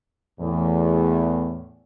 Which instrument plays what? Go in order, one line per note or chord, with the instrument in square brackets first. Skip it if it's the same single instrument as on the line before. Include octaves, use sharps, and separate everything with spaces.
[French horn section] E2 A2